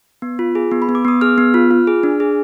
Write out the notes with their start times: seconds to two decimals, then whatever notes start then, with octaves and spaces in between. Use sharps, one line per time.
0.22 B3
0.39 F4
0.55 G#4
0.71 B3
0.82 B5
0.89 B3
0.95 D6
1.05 B3 D#6
1.21 G#4 F6
1.38 B3
1.54 F4
1.71 F4
1.87 G#4
2.03 D4
2.20 G#4